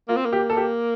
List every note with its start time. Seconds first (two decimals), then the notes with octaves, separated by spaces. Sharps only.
0.08 A#3 F4
0.17 C4
0.25 A#3
0.33 G4
0.50 A4
0.57 G4